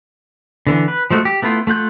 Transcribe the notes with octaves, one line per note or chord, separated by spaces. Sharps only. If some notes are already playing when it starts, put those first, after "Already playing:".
D3 E3 B3
B4
F3 G#3 A3 F#4
G4
A3 B3 E4 F4
A3 F4 F#5 G6